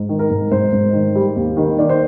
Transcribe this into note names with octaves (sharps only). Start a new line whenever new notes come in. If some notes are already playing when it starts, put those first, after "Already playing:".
Already playing: G#2
D#3
A#4
G#2
G#2 C5
G#2
D#3
G3
D#2
D#3
D#3 D5
C5